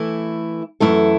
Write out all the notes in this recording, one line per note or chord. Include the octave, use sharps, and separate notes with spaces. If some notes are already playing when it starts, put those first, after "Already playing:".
Already playing: E3 A3 E4
F#2 E3 A3 E4 A4